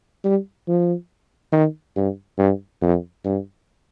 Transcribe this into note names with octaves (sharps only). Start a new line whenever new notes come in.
G3
F3
D#3
G2
G2
F2
G2